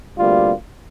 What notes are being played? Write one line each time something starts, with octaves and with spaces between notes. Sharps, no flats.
D2 C3 G3 A#3 F4